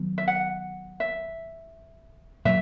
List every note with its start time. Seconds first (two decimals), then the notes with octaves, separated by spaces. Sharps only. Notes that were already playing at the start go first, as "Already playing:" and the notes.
Already playing: D#3 F#3 B3
0.18 E5
0.28 F#5
1.00 E5
2.45 A#2 F#3 E5